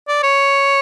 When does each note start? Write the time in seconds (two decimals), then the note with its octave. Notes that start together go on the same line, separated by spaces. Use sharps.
0.08 D5
0.24 C#5